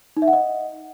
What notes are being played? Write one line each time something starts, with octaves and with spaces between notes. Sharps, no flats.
D#4
E5
F#5
D#5